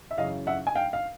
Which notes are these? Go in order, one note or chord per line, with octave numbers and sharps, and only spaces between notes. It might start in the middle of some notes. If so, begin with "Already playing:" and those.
E5
F#2 C#3 E3 D#5 F5
E5 F#5
G#5
F5 G5
F5